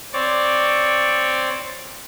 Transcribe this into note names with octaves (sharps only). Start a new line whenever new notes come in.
C4 C#5 D5